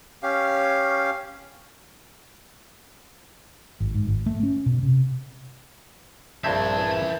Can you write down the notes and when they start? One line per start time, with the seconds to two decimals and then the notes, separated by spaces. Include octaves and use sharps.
0.23 C#4 G4 F5
3.80 G#1
3.94 G#2
4.07 G#1
4.26 A3
4.43 C#4
4.66 B2
4.83 C3
6.44 A#1 G2 C4 A#4 E5 A5 G#6
6.77 E3